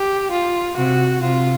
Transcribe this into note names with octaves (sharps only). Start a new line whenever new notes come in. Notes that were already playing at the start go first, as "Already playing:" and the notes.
Already playing: G4
F4
C3 F#4
C3 F4